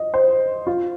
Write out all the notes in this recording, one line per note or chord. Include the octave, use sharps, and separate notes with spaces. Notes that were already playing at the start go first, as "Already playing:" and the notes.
Already playing: D#5
C5
F4